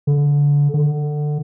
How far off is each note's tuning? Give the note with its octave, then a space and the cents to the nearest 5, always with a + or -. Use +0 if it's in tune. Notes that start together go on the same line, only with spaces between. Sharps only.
D3 -25
D3 +20